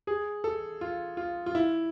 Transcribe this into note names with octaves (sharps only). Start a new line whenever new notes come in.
G#4
A4
F4
F4
F4
E4